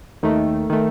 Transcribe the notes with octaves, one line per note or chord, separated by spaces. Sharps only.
D#2 D#3 A3
D#3 A3